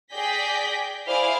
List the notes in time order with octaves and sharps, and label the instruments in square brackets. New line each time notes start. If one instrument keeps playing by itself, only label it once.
[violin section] G#4 D5 G5 G6 A#6 B6
E4 G#4 C5 D5 F5